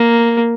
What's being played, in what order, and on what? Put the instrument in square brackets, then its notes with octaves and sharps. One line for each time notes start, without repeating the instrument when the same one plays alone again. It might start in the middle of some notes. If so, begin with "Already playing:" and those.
Already playing: [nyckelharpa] A#3